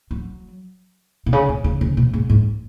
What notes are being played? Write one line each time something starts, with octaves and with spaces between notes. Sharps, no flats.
F#3
B2
C#3
B2
C#3
C#3
B2
G#2
G#2